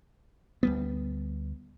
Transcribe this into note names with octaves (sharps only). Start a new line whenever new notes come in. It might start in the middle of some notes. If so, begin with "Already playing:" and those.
D2 G3 B3